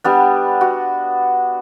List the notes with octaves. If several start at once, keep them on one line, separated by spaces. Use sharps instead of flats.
G3 B3 D4
F#4